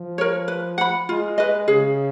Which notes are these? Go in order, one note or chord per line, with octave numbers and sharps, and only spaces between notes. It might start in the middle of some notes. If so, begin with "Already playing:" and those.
Already playing: F3
A#4 C#5
B4
F#5 B5
G#3 F4
B4 D#5
C#3 G#4